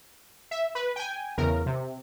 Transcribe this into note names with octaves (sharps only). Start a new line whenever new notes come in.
E5
B4
G5 G#5
E2 C#3 A#4
C3